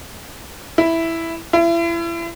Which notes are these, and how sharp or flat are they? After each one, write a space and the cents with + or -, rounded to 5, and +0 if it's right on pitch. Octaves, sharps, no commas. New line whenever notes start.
E4 +0
E4 +35